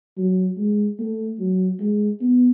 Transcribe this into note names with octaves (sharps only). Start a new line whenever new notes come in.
F#3
G#3
A3
F#3
G#3
B3